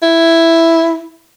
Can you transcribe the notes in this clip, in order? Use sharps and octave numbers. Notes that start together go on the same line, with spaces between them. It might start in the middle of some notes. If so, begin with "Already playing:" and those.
E4